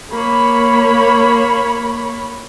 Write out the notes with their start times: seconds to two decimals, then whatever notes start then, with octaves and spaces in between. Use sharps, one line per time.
0.13 A#3 C#5 B5